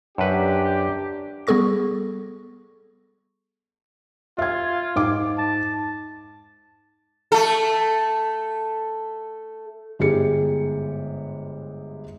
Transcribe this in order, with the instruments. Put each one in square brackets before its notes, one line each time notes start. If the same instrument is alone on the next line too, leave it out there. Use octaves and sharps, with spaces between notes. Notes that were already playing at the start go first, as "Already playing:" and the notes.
[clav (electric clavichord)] F#2 B4 [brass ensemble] D4 G4
[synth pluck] G3 B3 G#4 A4 C#6 A#6
[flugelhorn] F4 [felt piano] E5 G#6
[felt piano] G#2 D6
[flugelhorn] A5
[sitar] A3 A4
[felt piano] G1 G#2 G#3 G4 G#4 C#7